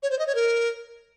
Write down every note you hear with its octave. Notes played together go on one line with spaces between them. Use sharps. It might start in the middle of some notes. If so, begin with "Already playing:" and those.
C#5
C5
D#5
C#5
A#4